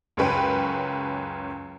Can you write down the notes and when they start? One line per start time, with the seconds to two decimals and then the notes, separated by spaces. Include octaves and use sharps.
0.17 C#2 F#2 C#4 B4 G5